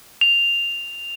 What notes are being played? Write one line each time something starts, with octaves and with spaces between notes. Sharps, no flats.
F7